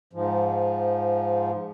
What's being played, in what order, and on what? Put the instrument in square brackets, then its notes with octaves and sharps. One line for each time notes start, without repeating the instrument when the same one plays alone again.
[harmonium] G#2 F3